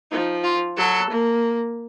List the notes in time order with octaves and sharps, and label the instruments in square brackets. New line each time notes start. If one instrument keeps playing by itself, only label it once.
[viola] F3 [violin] D#4
[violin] F4
[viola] F#3 [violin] A4
[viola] A#3